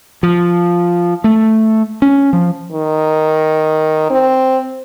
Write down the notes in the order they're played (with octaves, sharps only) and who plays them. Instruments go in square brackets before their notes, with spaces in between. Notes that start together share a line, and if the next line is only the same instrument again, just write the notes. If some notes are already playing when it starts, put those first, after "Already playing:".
[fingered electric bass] F3
A3
C#4
F3
[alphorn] D#3
C4